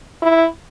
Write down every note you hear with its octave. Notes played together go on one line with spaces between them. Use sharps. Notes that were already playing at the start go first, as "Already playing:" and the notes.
E4